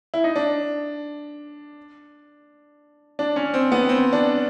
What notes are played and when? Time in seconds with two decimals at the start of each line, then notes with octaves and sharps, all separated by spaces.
0.14 E4
0.24 D#4
0.36 D4
3.19 D4
3.36 C#4
3.54 C4
3.72 B3
3.89 C4
4.13 D4